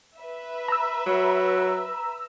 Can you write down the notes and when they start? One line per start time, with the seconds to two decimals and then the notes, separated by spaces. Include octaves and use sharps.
0.18 B4 E5
0.68 A#5 E6
1.06 F#3